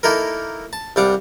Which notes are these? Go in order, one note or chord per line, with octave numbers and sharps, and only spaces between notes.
A#3 D#4 E4 A4 A#4
A5
C2 G3 F5 F#5 D6